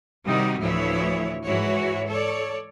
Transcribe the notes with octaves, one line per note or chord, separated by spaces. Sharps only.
C3 D#3 G3 D#4 F#4
D2 A2 E3 F3 E4 C#5
G#2 E3 E4 F#4 C#5
A4 C#5 D5